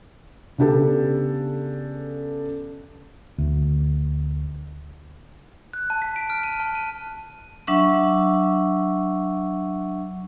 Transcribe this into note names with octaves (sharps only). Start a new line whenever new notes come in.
C#3 B3 D4 G4 A4
D2
F#6
A5
B6
D7
F6
D#7
A5
D#7
F#3 D4 E5 F#5 C#6 E6